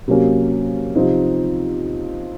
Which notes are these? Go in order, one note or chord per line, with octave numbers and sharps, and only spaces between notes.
C3 F#3 A#3 C#4
C3 F3 C4 D#4